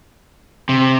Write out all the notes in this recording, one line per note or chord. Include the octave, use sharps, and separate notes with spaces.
C3